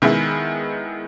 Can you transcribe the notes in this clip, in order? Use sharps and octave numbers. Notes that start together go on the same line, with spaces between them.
D#3 G#3 B3 E4